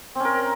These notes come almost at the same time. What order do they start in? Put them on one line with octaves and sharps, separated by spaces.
C4 C#4 A#4